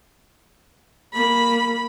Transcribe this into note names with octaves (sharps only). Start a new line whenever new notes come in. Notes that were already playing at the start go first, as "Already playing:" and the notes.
A#3 B5